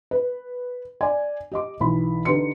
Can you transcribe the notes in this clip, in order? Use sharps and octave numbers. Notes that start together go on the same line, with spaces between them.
B4
D5 G#5
G4 D#5 D6
B1 E3 B5
D3 D#4 G4 B4 C6 C#7